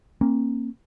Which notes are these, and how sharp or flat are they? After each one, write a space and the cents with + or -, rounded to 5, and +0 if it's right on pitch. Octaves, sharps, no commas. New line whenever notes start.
A#3 +0 C#4 -40